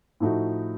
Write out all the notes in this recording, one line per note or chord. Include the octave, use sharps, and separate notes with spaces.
A2 F3 A3 D#4 F#4